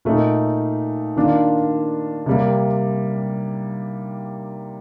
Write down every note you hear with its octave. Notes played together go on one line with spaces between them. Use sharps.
A#2 A3 D#4
D#3 A#3 D4 F4
C3 G3 A#3